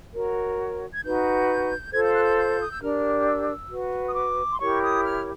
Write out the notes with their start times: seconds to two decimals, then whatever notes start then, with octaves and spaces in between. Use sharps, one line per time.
0.15 F#4 A#4 C#5
0.93 G#6
1.03 D#4 F#4 B4 G6
1.92 F4 A4 C5 G#6
2.03 G6
2.14 F#6
2.24 G6
2.37 G6
2.60 D#6
2.71 E6
2.81 D4 G4 A#4 F6
3.19 F6
3.27 E6
3.70 F#4 B4
4.08 D#6
4.15 D6
4.52 C6
4.59 E4 G4 A#4 C#5 C#6
4.82 D#6
5.04 F6